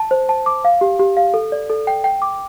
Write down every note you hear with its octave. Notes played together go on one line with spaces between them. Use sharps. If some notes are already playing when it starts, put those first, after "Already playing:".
Already playing: A5
C5
A5
D6
F5
G4
G4
F5
A4
D5
A4
G5
G5
D6